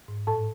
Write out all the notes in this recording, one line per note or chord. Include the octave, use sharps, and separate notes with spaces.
G#2
A2 A4 A5